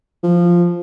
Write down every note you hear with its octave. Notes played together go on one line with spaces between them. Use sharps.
F3